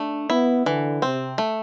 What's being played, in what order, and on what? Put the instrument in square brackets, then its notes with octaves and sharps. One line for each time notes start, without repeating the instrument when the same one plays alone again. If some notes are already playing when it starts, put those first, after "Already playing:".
Already playing: [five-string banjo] A3 [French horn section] D4
[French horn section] B3 [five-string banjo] E4
[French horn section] D3 [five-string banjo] E3
[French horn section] C3 [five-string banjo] C4
[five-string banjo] A3